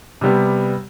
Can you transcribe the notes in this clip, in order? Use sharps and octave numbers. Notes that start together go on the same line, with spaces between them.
C3 G3 B3